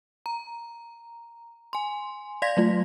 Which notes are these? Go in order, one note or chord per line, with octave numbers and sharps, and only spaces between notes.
A#5
G#5 C6
D5 F5 C6 G#6 A#6 B6
F#3 A3 F4